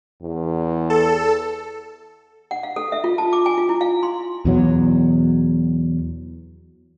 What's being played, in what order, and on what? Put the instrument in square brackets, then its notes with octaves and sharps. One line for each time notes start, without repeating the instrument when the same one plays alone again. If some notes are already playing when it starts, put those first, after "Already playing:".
[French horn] E2
[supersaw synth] A4
[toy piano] F#5
F5
A4
E5
F4
A5
D6
G#5
F4
E4
F5
C6
[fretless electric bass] E2 B2 F#3